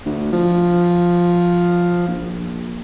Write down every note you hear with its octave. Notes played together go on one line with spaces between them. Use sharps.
D2
F3
A#1